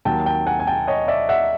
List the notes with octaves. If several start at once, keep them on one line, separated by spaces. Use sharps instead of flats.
D#2 D#3 F#3 G5 A5
G5 A5
F#5 G#5
G#5
G5 A5
C#5 D#5
D5 E5
E5 F#5